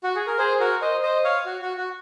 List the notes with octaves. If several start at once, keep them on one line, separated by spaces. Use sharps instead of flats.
F#4
G#4
A#4
G#4 C5
F#4 A#4
C5 D#5
C5 D#5
C#5 F5
F#4
F#4
F#4